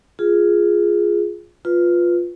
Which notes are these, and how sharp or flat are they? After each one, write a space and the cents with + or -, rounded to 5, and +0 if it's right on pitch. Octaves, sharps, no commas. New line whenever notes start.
F4 +0 G#4 +0
F4 +5 B4 +0